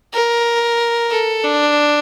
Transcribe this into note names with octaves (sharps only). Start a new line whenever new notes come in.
A#4
A4
D4